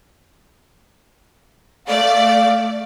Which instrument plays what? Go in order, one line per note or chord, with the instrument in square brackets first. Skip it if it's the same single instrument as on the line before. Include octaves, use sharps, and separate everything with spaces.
[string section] A3 D5 [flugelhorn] F5